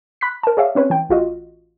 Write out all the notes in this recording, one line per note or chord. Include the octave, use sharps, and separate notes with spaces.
B5 F#6 B6
A#4 A5
G#4 C#5 D5 E5 F5
C4 C#4 B4 C#5
E3 G5
A1 F4 F#4 D#5